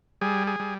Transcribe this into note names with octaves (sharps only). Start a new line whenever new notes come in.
G3 G#4
G#4
G3